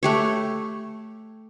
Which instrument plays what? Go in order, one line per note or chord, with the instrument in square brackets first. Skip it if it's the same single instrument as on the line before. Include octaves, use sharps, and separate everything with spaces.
[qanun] A3 G4 C#5